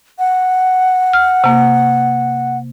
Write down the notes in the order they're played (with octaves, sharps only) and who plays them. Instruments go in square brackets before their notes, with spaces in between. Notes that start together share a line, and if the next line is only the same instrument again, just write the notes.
[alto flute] F#5
[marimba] F6
C3 A#3